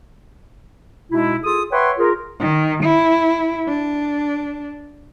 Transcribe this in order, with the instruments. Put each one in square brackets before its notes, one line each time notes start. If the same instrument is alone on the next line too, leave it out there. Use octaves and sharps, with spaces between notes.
[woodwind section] B2 G#3 D#4 E4
F4 G#4 A4 D#6
B4 C#5 E5 F#5 G5 C6
F4 G#4 A#4
[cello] D#3
E4
D4